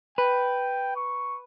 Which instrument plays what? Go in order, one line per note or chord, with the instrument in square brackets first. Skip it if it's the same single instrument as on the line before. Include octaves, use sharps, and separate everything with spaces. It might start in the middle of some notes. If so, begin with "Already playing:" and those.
[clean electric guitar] B4 [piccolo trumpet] G5
[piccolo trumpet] C#6